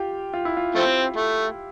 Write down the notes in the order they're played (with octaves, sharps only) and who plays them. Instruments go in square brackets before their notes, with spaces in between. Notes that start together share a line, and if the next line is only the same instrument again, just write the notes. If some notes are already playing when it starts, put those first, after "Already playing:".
Already playing: [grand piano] F4 G4
F4
E4
F4
[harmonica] F3 A3 C4
A3